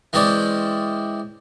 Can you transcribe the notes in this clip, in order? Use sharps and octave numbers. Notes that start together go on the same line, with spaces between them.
E3 G#3 C4 C#4 D5